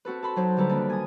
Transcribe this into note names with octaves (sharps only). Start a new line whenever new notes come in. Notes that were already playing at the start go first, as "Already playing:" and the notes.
C4 F#4 A4 B4
A4 A5 B5 C6
F#3 D#4 C5
D3 G3 A4 B4 A#5
D#2 D4 B4
G#5 D#6